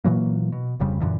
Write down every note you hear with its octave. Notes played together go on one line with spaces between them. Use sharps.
A#2 E3 F#3 A#3
B2
D1 F2 C#3 G3
F#2 A#2 D3 E3